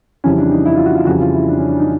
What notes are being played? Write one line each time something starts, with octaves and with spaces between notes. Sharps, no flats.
F2 C#3 E3 G3 C#4
D4
D#4
E4
F4
F#4
F4
F2 C#3 E3 G3 F#4
F4
E4
D4
C#4
D4
D#4